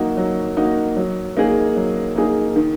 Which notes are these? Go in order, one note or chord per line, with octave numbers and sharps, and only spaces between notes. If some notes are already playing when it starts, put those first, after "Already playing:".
Already playing: F#3 A#3 D#4 F#4
F#3
A#3 D#4 F#4
F#3
A#3 D#4 G#4
F#3
A#3 D#4 G#4
D#3